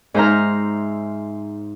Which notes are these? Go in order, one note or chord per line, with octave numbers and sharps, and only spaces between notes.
G#2 D#4 C5 E5 A#5 F6